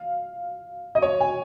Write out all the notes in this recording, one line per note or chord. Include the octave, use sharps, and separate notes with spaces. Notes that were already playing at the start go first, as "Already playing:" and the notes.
Already playing: F5
D#5
C#5
G#5